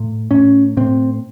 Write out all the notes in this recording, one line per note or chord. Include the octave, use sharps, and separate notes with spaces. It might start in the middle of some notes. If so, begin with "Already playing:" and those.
Already playing: A2
A2 C#4
A2 C4